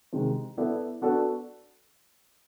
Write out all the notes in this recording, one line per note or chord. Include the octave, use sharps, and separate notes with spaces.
C3 D#3 G#3
B3 E4 A4 D5
B3 D4 F#4 A4 D5